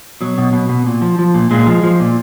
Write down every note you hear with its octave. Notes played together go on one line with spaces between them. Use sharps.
B2 F#3
B2
B2
B2
A#2
F3
F3
A#2
A#2 G#3
F3
F3
A#2